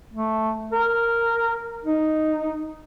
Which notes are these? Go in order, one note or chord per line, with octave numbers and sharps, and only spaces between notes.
A3
A#4
D#4